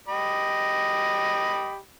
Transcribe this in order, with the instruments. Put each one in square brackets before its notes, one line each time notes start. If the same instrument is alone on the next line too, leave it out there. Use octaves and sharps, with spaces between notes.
[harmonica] G4 D#5 B5